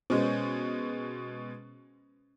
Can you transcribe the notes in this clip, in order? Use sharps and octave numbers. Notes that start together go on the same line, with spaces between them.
B2 G#3 B3 C#4 C5